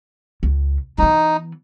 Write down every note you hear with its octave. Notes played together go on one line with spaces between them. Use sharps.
C#2
E3 B3 D#4